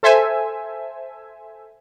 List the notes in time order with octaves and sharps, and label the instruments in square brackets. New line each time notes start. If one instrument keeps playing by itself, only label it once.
[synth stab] A4 C5 E5 G#5